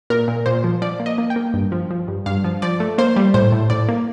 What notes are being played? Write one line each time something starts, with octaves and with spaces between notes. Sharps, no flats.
A#2 A#4
A#2
A#2 C5
F3
F3 D5
A#3
D#5
A#3
G5
A#3
G2
F3
F3
G2
G2 F5
F3
F3 D5
A3
A#3 C5
G3
A2 C5
A2
A2 D5
A#3